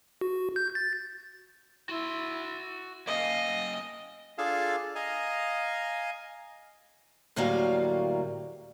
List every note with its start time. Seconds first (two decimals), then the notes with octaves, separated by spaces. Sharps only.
0.21 F#4
0.56 G6
0.75 A6
1.89 E4 F#4 C6
3.07 A#3 C#4 D#5 F5
4.38 D4 F4 G#4 A4 F5 A5
4.95 D#5 F5 G#5 A#5
7.36 D2 A2 F#3 G3 A#3 F5